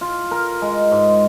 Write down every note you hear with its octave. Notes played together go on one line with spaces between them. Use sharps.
F4
A#4
G#3
G#2